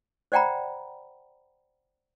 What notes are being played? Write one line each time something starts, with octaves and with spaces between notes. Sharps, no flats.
C5 D5 F#5 G5 A#5 B5